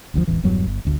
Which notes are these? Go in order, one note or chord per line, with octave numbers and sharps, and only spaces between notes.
F#1 D2 A#2 F3
E1 A1 E3
E1 E2 G2 F#3
G1
G1 D2 G2